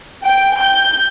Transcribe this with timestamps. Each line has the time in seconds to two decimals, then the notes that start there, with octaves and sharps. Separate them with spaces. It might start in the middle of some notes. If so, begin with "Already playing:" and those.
0.24 G5
0.61 G6